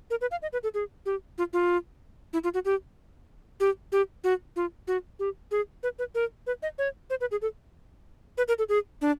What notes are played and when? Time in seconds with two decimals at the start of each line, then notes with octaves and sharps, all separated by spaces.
0.10 A#4
0.21 B4
0.31 F5
0.42 D#5
0.53 B4
0.63 A4
0.74 G#4
1.06 G4
1.38 F4
1.53 F4
2.33 E4
2.44 F4
2.54 F#4
2.65 G4
3.60 G4
3.92 G4
4.24 F#4
4.56 F4
4.87 F#4
5.19 G4
5.51 G#4
5.83 B4
5.99 B4
6.15 A#4
6.47 B4
6.63 D#5
6.78 C#5
7.10 C5
7.21 B4
7.31 G#4
7.42 A4
8.38 B4
8.48 A#4
8.59 A4
8.69 G#4
9.01 D4